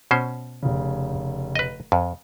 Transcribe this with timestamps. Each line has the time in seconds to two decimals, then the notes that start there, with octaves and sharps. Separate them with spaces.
0.11 B2 C#4 C5
0.62 F1 C#3
1.56 B4 D#5
1.92 F2